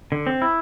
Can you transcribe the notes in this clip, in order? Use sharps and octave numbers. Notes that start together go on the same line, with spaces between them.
D3
C4
E4